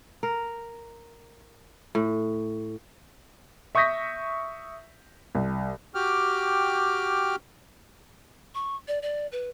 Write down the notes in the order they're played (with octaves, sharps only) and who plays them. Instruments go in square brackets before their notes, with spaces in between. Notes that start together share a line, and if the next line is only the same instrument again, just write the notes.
[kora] A#4
A2
[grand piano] E5 C#6 D#6 G6 A#6 B6
C2
[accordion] F#4 G4 G5 D6 F6
[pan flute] C#6
D5
D5
B4